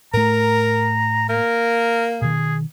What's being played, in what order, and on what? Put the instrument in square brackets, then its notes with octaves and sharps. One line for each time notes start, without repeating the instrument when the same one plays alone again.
[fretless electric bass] A2 A3 [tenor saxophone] A#4 [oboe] A#5
[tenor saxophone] A#3 [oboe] A#4
[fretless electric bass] B2 D#3 [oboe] G#4